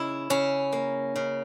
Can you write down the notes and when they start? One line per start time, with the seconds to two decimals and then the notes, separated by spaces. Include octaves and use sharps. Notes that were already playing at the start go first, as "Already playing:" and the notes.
Already playing: C#3 E4
0.30 C#3 C#4
0.73 A#3
1.16 C#3